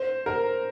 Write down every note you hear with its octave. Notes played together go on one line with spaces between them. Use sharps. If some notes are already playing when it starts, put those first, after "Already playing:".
Already playing: C5
A#4